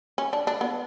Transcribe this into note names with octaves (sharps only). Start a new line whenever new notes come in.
C#4
D4
D4
B3